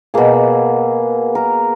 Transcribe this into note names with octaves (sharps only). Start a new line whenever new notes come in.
B2 A#3 G#4
A#4